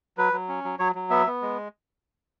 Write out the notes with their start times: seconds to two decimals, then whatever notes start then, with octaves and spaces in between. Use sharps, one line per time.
0.18 F#3 B4
0.33 F#3
0.49 C#4
0.64 F#3
0.79 F#3 C#5
0.95 F#3
1.10 B3 E5
1.26 B3
1.42 G#3